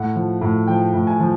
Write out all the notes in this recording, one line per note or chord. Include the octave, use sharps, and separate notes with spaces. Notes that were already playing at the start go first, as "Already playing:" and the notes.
Already playing: A2 F#5
F3
A2
F3 G5
A2
G#5
F3